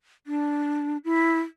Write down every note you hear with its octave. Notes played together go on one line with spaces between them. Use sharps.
D4
E4